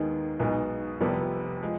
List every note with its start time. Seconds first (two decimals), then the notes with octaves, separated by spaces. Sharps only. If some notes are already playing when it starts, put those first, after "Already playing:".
Already playing: D#2 D#3 G#3 B3 D#4
0.40 B1 B2 G#3 B3 D#4
1.01 F1 F2 C3 G3 B3
1.62 F3 G#3